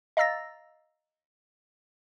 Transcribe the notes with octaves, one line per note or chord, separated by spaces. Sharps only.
D#5 F5 A#5 E6 A6 A#6